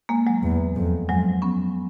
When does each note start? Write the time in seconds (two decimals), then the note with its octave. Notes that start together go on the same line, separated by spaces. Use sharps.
0.09 G#3 A#3
0.27 F#3 G#3
0.43 E2
0.76 F2
1.09 F2 F#3 G#3
1.42 B3 C#4